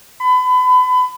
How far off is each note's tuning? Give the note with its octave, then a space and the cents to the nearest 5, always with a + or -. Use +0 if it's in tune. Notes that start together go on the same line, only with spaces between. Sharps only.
B5 +30